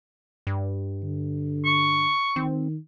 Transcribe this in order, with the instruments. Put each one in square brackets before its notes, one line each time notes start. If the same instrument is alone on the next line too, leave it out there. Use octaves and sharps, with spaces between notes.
[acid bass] G2
[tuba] D3
[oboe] C#6
[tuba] D#3 [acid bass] C4